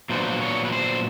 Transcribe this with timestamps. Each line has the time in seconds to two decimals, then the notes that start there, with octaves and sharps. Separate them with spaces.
0.10 A#2 F#3 B3 D4 C5
0.41 C#5
0.65 B4
0.72 C5